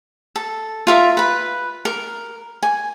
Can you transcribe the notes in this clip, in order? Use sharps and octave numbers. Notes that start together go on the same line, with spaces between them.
A4
F4 A#4 E5
B4 B5
A#4
G#5